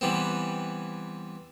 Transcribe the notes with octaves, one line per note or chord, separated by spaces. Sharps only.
E3 G3 B3 C4